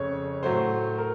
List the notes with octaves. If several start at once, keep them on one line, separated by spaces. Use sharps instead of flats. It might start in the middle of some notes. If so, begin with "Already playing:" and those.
Already playing: F2 C#3 A3 C#5
A2 F#3 A3 C5
A#4